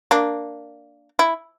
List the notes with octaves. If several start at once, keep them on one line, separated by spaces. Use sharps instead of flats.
A#3 D4
E4